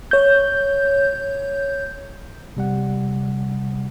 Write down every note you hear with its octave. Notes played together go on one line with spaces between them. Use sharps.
C#5 G6
C3 G3 F#5